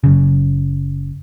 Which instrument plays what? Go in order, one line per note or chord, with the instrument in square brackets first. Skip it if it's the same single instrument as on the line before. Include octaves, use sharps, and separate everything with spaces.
[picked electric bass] F#1 C#3